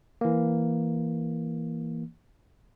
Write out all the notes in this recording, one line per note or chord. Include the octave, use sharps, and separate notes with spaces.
E3 A#3